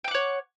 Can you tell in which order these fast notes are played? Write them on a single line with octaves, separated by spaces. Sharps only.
G5 D6 F#5 C#5